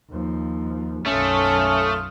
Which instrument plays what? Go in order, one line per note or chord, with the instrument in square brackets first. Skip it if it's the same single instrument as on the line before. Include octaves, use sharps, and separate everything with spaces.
[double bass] D#2 F3
[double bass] B1 F#2 [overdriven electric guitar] A3 [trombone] C#4 [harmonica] F4 D#6 F6